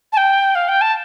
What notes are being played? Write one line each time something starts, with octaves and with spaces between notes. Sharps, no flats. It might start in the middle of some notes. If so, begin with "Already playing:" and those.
A5
G5
F5
G5
A5